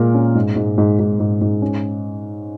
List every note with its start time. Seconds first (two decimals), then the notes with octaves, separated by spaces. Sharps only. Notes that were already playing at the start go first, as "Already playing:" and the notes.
Already playing: A#2 G#3 A#4
0.15 C#4
0.35 G#2
0.56 G#2
0.78 G#2
0.99 G#2
1.20 G#2
1.41 G#2
1.62 C#4